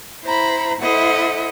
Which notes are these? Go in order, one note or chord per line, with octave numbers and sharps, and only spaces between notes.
E4 C5 A#5 B5
E4 A4 C5 D#5 E5 F#5